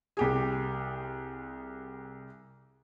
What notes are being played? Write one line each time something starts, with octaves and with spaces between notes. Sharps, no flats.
C2 G4 G#4